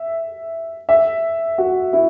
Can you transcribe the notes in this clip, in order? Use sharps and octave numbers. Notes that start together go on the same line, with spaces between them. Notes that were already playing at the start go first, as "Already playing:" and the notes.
Already playing: E5
E5
F#4
E4